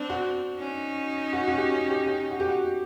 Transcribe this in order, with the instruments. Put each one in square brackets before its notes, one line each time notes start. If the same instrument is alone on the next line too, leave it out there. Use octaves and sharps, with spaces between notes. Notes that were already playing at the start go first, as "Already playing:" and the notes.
Already playing: [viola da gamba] C4 D4
[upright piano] F#4
[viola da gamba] C#4 D#4
[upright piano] F#4
F#4
G4
G4
G4
F#4
G4
F#4